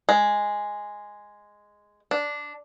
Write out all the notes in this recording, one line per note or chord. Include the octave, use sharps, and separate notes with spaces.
G#3
D4